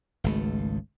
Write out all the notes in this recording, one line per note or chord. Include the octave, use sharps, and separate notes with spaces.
G#1 C#2 A3